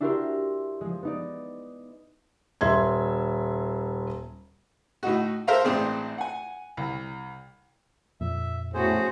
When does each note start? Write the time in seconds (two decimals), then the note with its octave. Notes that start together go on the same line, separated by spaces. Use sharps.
0.01 D4 E4 F#4 G4 A#4 C6
0.81 F3 G#3
1.03 B3 D#4 D5
2.61 D#1 E5 C6 G#6
5.03 A2 D#4 F#4
5.47 A4 A#4 C5 E5 F5 A#5
5.64 A1 G#3 C4 D4 G#4
6.18 F#5 G#5
6.77 C2
8.21 F2 A#2 E5
8.74 A2 B3 C#4 F#4 G#4 C5